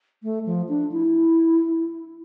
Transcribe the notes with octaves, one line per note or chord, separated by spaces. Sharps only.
A3
F3
D4
E4